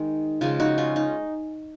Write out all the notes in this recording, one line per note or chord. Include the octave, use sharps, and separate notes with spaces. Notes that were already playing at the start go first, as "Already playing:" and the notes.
Already playing: D#3 G#3
C#3 F3 G#3 F4 G#4
D#4 F#4
C#4 F4
D#4